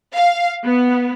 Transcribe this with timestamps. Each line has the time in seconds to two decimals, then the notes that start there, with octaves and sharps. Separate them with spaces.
0.14 F5
0.63 B3